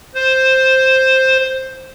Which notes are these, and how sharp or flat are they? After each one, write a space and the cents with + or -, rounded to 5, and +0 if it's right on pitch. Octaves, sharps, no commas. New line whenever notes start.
C5 +5